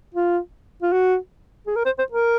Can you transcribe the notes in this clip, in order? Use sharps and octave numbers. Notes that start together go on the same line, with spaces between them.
F4
F4
F#4
G#4
A#4
C5
C5
A#4